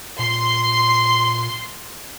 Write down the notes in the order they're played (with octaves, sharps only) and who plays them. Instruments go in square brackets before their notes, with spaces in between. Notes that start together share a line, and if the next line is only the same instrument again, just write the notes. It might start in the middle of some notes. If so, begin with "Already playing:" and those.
[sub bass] A#2 [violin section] C6